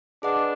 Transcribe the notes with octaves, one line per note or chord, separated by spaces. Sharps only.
D4 G#4 B4 D#5 F#5